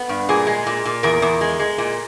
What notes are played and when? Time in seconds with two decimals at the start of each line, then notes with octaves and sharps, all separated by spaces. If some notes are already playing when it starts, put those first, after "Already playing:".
Already playing: B3
0.09 G2
0.29 A#2 G#4
0.47 G#3
0.67 A#2
0.86 A#2
1.03 E2 A#4
1.22 E2
1.41 G#3
1.59 G#3
1.78 A#2